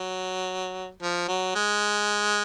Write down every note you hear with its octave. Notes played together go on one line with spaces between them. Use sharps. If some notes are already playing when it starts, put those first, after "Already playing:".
Already playing: F#3
F3
F#3
G#3